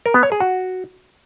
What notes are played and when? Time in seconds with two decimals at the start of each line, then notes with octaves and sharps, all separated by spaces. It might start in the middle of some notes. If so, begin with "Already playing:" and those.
0.06 A#4
0.14 B3
0.23 C#5
0.32 G#4
0.40 F#4